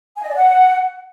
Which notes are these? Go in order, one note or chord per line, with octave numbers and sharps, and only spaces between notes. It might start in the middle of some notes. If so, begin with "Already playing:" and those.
G#5
D#5
D5
F#5